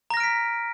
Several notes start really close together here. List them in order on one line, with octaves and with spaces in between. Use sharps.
A#5 A#6 F6 D7 B6